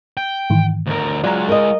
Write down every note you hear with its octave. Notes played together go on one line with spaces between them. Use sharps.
G5
G#2 D#3 E3
D2 A#4
F#3 G#3 F4 D5 A#5
A#4 D#5